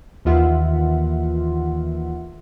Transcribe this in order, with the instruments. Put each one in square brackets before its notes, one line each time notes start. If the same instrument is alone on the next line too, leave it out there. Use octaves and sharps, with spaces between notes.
[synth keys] D#2 D#3 E3 F4 E5 F#5